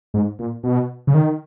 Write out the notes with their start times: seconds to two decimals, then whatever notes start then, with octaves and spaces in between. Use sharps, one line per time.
0.14 G#2
0.39 A#2
0.64 B2
1.07 C#3
1.14 D#3